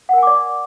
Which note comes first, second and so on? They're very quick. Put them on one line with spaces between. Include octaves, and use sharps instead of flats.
F#5 A#4 G#5 D6 D5